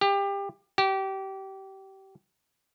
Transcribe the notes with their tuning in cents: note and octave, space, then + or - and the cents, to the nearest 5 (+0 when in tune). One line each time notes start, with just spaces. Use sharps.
G4 +25
G4 -25